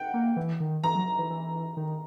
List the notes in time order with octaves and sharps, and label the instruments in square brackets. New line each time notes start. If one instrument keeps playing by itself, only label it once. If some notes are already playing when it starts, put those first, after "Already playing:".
Already playing: [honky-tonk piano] F#5 G5
[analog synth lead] A#3
E3
D#3
[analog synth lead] E3 [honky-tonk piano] A#5
[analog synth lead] F#3
E3
E3
D#3